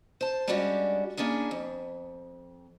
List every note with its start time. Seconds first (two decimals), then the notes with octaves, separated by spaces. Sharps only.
0.21 C5 A5
0.48 G3 G#3 C#4 D4 F#4 G4
1.17 A#3 C#4 D4 E4 G#4
1.51 F2